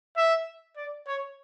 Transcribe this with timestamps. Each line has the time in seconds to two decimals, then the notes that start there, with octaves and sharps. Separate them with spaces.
0.17 E5
0.77 D5
1.07 C#5